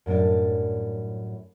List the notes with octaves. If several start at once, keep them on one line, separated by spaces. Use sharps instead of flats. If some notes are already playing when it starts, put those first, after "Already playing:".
F#2 A2 G3 D4